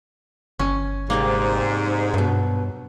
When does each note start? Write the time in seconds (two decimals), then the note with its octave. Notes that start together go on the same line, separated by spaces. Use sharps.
0.59 G1 C#4
1.10 F2 G#2 C3 G3 A#3
2.14 G2 B2 F#3